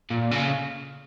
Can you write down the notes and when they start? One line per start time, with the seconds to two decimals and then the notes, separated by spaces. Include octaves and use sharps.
0.10 A#2
0.31 C#3